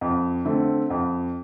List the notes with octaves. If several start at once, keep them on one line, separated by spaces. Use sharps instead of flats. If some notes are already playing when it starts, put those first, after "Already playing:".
F2
D3 A3 C4
F2